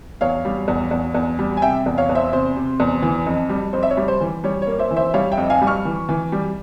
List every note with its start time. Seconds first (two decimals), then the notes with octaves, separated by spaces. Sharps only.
0.21 E2 C#5 F5
0.45 G3
0.68 E2
0.91 E2
1.14 E2
1.39 G3
1.57 G#5
1.62 C3 E5 G5
1.86 E2
1.98 C#5 F5
2.09 E2
2.15 C5 E5
2.32 C3 C5
2.56 C3
2.80 E2
3.02 E3
3.26 F2
3.49 G3
3.73 F2 C5
3.83 E5
3.90 C#5
3.97 G3
4.08 C5
4.21 E3
4.44 G3 C#5
4.62 A#3 C#5
4.79 C5 E5
4.91 E3
4.96 C5 E5
5.14 G3 C#5 F5
5.32 E5 G5
5.37 F2
5.50 F5 G#5
5.61 G3
5.67 C#6 F6
5.85 E3
6.09 E3
6.32 G3